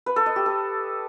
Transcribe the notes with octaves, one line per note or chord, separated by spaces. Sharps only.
B4
A4
D#5
G4
A4